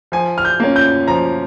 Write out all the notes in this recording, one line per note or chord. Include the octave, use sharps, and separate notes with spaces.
F3 G#5
F6
G6
A#3 C#4
G6
F3 A#5